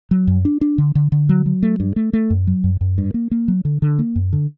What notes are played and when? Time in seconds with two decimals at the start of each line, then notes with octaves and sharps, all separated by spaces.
0.11 F#3
0.27 F#2
0.45 D4
0.61 D4
0.78 D3
0.95 D3
1.12 D3
1.29 F#3
1.46 F#3
1.63 A3
1.80 G2
1.96 A3
2.13 A3
2.30 F#2
2.47 F#3
2.64 F#2
2.81 F#2
2.98 G2
3.14 A#3
3.31 A#3
3.48 F#3
3.65 D3
3.82 D3
3.99 A#3
4.16 F#2
4.33 D3